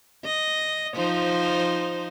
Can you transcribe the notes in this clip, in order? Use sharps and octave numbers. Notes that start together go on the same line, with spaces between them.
D#5
F3 D#4 C5